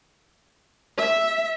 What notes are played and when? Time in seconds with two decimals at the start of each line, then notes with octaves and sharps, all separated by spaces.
0.97 E5